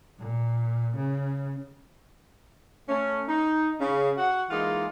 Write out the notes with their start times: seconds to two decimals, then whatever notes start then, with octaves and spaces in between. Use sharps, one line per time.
0.19 A#2
0.96 C#3
2.89 A3 C#4
3.28 D#4
3.80 C#3
4.18 F#4 F#5
4.51 E3 G#3 A#3 D#4 F4